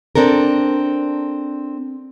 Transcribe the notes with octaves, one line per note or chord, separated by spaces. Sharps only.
C4 D4 A4 A#4